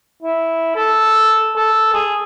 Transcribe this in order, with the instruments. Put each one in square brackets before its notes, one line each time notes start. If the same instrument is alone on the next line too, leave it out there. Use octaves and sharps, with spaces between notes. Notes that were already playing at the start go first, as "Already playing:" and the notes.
[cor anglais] E4
A4
A4
G#4